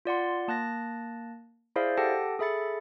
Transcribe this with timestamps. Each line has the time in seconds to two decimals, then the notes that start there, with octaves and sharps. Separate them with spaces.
0.05 F4 D5 F#5 C6
0.48 A#3 A5 F#6 A6 A#6
1.76 E4 G#4 C5 D5 E5 F5
1.97 G4 A4 F#5 G5 A5 A#6
2.39 G#4 A4 E5 B5 A6 C#7